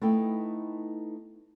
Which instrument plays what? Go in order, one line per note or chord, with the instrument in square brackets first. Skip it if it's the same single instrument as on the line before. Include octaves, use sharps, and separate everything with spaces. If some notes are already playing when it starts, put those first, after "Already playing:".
[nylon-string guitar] A3 B3 D#4 E4 G5